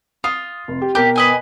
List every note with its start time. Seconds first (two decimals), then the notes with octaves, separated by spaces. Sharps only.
0.24 F4 D#6
0.68 F1
0.82 G4
0.95 B2 G4 A#4 D6
1.16 B4 D#5 G#5